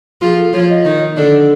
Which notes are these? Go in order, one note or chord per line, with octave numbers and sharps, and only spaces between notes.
F3 F4 G#4
A4
F3 F4 C#5
D#5
D#3 D#4
D3 D4 A4